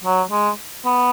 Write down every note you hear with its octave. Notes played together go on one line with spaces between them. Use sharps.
F#3
G#3
B3